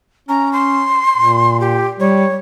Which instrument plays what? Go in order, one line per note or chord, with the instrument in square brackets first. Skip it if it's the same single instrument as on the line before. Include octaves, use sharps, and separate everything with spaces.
[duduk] C#4 [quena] A#5
[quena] C6
[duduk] A#2
[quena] G4
[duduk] G3 [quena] C#5